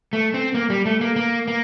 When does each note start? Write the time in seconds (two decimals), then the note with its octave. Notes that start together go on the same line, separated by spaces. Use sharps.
0.13 A3
0.34 C4
0.54 A#3
0.70 G3
0.86 A3
1.01 A#3
1.16 A#3
1.48 A#3